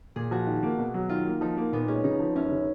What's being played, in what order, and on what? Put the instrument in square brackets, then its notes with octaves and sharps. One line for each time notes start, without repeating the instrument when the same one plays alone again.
[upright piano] A#2 [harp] G#4
[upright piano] F3 [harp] F#4
[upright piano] D#3
A#3
B2
F#3
[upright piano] D#3 [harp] F4
[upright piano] A#3
[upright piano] F3 [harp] D#4
[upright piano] A#3
[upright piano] A#2 [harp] B3
[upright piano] G#3 [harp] C#4
[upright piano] C#3 [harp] D#4
[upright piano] F3
[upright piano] F#2 [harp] C#4
[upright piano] C#3